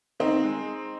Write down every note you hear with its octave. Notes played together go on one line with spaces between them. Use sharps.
D#3 C4 D#4
G#3